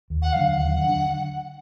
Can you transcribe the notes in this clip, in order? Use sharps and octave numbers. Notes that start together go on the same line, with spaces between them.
D#2
F#5
D3 F#3 D4 F5
F#5
D#2
D3 F#3 D4